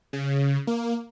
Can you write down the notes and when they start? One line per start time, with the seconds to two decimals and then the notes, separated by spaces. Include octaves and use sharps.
0.13 C#3
0.67 A#3